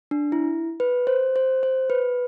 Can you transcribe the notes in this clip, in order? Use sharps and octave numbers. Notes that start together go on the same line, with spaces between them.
D4
E4
B4
C5
C5
C5
B4